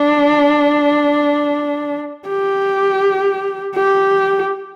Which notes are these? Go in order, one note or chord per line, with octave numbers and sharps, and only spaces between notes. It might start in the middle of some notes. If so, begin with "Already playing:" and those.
Already playing: D4
G4
G4